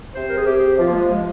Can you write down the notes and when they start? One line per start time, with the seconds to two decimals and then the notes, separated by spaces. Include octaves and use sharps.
0.15 C3 C5
0.29 A#4
0.37 G#4
0.46 C3 G4
0.79 F3 F4
0.89 A#3
0.95 G#3
1.10 F3 G#3